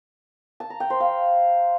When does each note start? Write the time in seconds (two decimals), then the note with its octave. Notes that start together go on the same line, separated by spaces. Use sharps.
0.60 A5
0.70 A#5
0.80 G5
0.90 C5
1.00 F5